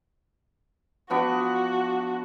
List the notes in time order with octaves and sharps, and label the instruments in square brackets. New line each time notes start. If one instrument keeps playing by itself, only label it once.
[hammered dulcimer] F3 B3 D4 [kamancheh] F#4